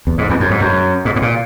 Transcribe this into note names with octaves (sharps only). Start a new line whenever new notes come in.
E2
G#2
E2
F#2
G#2
F#2
G#2
G#2
A#2